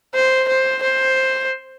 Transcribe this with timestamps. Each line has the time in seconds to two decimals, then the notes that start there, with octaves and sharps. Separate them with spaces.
0.15 C5
0.48 C5
0.82 C5